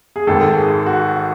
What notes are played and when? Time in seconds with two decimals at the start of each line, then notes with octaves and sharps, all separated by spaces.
0.16 G#4
0.27 G#1 G#2 D#3 A4
0.57 G#4
0.86 F#4